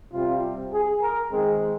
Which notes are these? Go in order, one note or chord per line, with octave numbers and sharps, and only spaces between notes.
C3 G3 C4 F4
G#4
A#4
D#3 G#3 C4 G#4